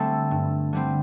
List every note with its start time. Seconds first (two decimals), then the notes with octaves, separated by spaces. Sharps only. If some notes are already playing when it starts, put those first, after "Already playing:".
Already playing: D3 G3 A3 C4 A4
0.31 G2
0.73 D3 G3 C4